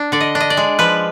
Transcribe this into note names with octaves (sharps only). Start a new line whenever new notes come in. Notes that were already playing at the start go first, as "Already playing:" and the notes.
Already playing: D4
D3 D5
D#5
D4
D#5
D5
G#3
F3 B4